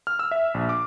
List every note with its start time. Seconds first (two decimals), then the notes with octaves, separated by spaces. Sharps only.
0.07 F6
0.19 E6
0.31 E5
0.54 A#1
0.69 D6